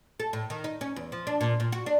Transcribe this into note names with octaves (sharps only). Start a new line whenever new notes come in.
A4
A2
D#3
D#4
C#4
E2
F3
D4
A#2
A#2
F#4
D4